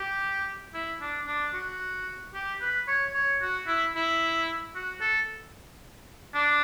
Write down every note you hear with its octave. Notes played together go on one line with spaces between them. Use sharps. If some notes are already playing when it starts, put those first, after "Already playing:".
Already playing: G4
E4
D4
D4
F#4
G4
B4
C#5
C#5
F#4
E4
E4
F#4
A4
D4